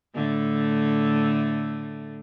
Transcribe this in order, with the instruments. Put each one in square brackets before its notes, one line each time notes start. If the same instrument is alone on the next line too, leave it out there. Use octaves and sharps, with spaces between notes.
[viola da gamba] A2 D3 A3